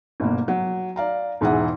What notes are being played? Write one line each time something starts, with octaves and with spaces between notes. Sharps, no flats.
G1 B2 A#3
F#3
D5 F5 A#5
E1 G#2 E3 G#4 E5 F#5